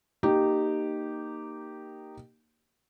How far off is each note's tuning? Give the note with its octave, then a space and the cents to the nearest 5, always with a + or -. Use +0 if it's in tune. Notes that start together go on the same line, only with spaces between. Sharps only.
A#3 +0 D#4 -15 G4 -10